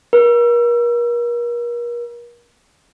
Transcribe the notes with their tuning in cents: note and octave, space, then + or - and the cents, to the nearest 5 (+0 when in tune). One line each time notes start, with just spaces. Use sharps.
A#4 +40